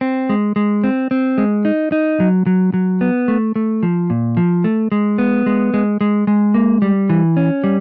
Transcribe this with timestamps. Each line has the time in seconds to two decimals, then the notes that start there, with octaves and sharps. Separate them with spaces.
0.01 C4
0.29 G#3
0.56 G#3
0.84 C4
1.11 C4
1.38 G#3
1.65 D#4
1.92 D#4
2.20 F#3
2.46 F#3
2.74 F#3
3.01 B3
3.28 A3
3.56 A3
3.83 F3
4.10 A#2
4.37 F3
4.64 A3
4.92 G#3
5.18 B3
5.46 G#3
5.74 G#3
6.01 G#3
6.27 G#3
6.54 A#3
6.82 G3
7.10 E3
7.37 C#4
7.64 G3